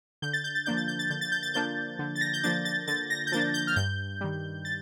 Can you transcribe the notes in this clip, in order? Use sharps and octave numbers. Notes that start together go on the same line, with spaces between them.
D3 G6
A6
G6
A6
F3 A#3 D4 G6
A6
G6
A6
D3 G6
A6
G6
A6
F3 A#3 D4 G6
D3
A6
A#6
G6
F3 A#3 D4 A6
A6
D3 A6
A#6
G6
F3 A#3 D4 A6
G6
F6
G2 G6
D#3 G3
A6